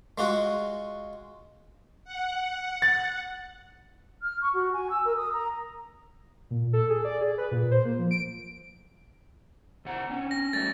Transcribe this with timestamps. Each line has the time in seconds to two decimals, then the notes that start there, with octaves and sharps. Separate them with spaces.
0.18 G#3 F4 F#4
2.05 F#5
2.82 A6
4.22 F6
4.41 C#6
4.53 F#4
4.73 G#5
4.90 E6
5.04 A#4
5.16 D#6
5.32 A#5
6.51 A#2
6.73 A4
6.90 G#4
7.05 D5
7.21 G#4
7.38 B4
7.51 A#2
7.71 C5
7.85 A#3
7.99 F3
8.11 D7
9.85 C3 F#5 A#5
10.09 C4 C#4
10.31 A#6
10.53 F#3 G3 A3 A6